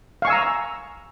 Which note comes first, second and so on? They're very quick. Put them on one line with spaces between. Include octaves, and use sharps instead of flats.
F5 C#6 G#5 E6 A#5